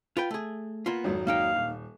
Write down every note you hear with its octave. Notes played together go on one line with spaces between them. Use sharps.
F4 B4 G5
A3 G#4
A#3 B3 F4
G#1 F2 F#3
A#3 D#4 F5 G5
D#1